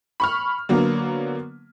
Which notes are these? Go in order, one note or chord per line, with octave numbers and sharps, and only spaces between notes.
B5 C#6 F6
D3 F#3 A#3 B3